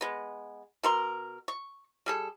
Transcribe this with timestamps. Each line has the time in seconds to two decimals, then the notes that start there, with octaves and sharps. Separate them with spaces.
0.01 G#3 B3
0.83 B2 A#4 C6
1.48 C#6
2.06 G3 G#4 A4